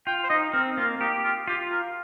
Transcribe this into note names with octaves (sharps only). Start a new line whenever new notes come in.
F4 G5
C5
D#4 D#5
C4 A#4
A#3 F4
D#4 G4
F4
F4 G4
A#4